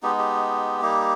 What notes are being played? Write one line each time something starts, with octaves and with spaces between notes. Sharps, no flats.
G#3 B3 D#4 G4
G4
G3 A#3 D#4